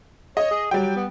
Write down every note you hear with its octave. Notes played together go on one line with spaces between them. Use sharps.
C#5 D#5
G#4
F#3 G3 G5
B3